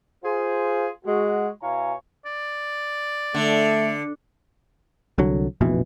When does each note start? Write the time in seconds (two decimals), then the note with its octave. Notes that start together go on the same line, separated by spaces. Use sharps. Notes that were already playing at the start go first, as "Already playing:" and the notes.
0.23 F4 G#4 C5
1.05 G#3 F#4
1.61 B2 E4 C#5 F5 G#5 A#5
2.26 D5
3.34 D3 A3
5.18 C2 D3 F#3
5.61 F1 A#1 B2 E3